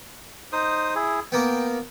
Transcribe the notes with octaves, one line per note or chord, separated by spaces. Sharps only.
D#4 C5 D#6
E4 G#4
A#3 B3 G5